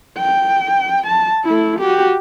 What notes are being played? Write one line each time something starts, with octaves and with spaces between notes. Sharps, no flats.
G5
A5
A3 E4
F#4 G4